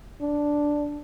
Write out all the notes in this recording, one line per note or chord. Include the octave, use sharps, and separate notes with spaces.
D4